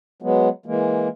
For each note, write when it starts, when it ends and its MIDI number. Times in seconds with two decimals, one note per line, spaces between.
0.22 0.49 54
0.22 0.49 56
0.22 0.49 59
0.66 1.08 52
0.66 1.08 56
0.66 1.08 58